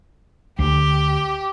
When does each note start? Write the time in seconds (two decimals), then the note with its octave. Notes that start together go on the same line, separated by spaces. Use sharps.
0.59 D2 G4